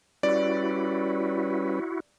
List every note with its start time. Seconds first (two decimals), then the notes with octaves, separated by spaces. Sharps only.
0.23 G3 C#4 E4 F#4 B4 D5